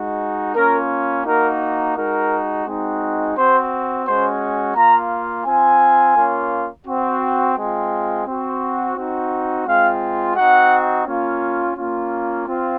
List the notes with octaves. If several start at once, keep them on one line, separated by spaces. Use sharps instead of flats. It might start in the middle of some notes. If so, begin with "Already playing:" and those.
Already playing: G#3 D#4 F#4
A#3 C#4 F4 A#4
A#3 D#4 F#4 A#4
G#3 D#4 F#4 A#4
G#3 C4 D#4 F#4
C4 F#4 C5
G#3 C#4 F#4 C5
A#3 F4 A#5
C4 F4 G#5
A#3 C#4 F4
C4 F#4
G#3 C4 F4
C4 F#4
C4 D#4 F#4
G#3 C4 F4 F5
C4 D#4 F#4 F#5
A#3 C#4 F4
A#3 C#4 F4
C4 F4